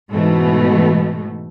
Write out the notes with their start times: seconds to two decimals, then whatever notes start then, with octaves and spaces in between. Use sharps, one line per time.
0.12 G#2 B2 E3 A3